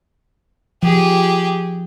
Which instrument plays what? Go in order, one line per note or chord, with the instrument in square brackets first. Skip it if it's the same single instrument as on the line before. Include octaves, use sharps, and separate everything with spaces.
[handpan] F3 [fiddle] G4 G#4